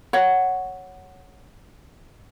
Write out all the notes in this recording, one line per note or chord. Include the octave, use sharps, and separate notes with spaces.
C#5 F#5